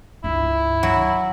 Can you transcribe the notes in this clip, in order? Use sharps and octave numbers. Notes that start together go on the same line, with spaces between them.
C#2 G2 E4
F#3